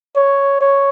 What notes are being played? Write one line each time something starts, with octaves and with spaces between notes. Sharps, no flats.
C#5
C#5